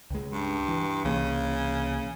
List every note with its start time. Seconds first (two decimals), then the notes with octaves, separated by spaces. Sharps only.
0.10 C#2 G#3
0.32 G2
0.68 E3
1.04 C2 C#3 E3 A#3